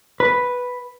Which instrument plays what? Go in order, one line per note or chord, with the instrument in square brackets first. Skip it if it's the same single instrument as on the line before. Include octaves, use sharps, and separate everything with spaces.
[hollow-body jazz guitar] B4